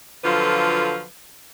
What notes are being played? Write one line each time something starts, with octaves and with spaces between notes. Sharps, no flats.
D3 F3 F#3 F4 A4 B4